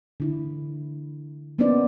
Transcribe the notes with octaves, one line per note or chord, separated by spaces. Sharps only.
D3 E4
A#3 B3 C#4 D#4 C5 D5